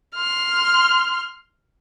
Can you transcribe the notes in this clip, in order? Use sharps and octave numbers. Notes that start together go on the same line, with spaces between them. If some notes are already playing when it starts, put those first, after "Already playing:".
C6 F6